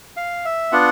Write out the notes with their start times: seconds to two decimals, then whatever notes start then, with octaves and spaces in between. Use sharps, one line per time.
0.17 F5
0.45 E5
0.72 B3 D4 F4 F#5